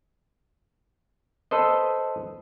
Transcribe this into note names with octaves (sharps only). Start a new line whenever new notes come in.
A4 B4 C5 D#5